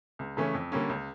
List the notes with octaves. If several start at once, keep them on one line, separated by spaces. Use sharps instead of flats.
C#2
C#3 E3 A3 C#4
F2
D3 G3 A#3 C#4
C#2